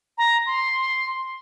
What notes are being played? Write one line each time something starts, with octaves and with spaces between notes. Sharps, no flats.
A#5
C6